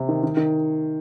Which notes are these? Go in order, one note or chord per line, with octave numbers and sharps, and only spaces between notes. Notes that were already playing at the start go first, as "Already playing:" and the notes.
Already playing: C3
D#3
D#3
D#3